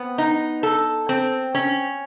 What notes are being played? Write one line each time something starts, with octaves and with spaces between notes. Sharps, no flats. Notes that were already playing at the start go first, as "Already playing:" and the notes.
Already playing: B3 C4
D#4
A4
C4
C#4